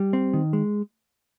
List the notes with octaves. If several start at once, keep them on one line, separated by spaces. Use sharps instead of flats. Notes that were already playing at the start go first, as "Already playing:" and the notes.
Already playing: G3
C4
D#3
G#3